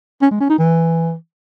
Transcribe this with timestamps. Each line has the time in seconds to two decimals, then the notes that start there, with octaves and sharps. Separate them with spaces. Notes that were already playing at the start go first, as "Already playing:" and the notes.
0.22 C#4
0.31 G#3
0.40 C#4
0.49 D#4
0.59 E3